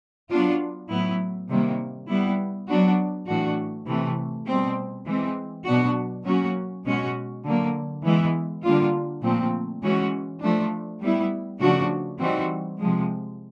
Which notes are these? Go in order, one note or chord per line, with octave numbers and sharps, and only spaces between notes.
F#3 B3 D4 F4
A2 F#3 B3 E4
C3 D#3 G3 A#3
G3 B3 E4
F#3 B3 D4 F#4
A2 E3 A3 D4 F#4
C3 E3 A3
B2 G3 C4
E3 G#3 C4
B2 F#3 B3 D4 F#4
F#3 A#3 C#4 F#4
B2 G#3 C#4 F#4
D3 F#3 A#3
E3 G#3 B3 E4
D3 G3 A#3 D4 F4
A#2 F3 A3 C4
E3 G#3 C#4 F#4
F3 A3 D4
G3 B3 E4
C#3 F3 A3 D4 F#4
E3 G3 C4 D#4 F#4
C3 F3 G#3